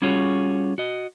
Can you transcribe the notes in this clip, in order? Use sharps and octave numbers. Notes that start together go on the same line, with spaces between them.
G3 C#4 F4 F#4 G#4 C#5
F#4 D#5